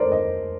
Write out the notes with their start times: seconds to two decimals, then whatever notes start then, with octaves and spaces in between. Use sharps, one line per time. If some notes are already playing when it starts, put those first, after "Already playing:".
Already playing: A4 A#4 C5 D5
0.11 D#5